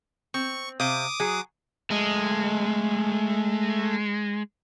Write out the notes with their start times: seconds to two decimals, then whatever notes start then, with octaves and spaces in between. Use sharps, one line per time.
0.34 C4 C#6
0.80 C3 C5 F5 D6 D#6
1.20 F#3 G#4
1.91 G#3 A3 D#5